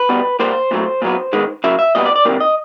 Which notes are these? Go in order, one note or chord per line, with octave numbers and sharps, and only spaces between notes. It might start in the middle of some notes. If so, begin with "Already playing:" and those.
Already playing: B4
B2 G3 B3
A#2 G3 A#3 C5
A#2 F#3 A3
A#2 F#3 B3
D#3 G#3 B3
C#3 F#3 A#3 E5
E5
A#2 G3 B3 D#5
D5
D5
C3 D#3 G3 A#3
D#5